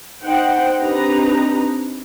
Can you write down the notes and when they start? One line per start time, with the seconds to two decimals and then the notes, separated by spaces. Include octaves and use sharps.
0.22 D#4 C5 F#5 G5
0.79 C4 D4 D#4 G4 B4 A#5